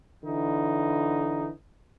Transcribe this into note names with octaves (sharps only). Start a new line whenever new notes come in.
D3 E3 D#4